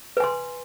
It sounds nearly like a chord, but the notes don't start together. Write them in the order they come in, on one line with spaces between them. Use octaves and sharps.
B4 G#5 C6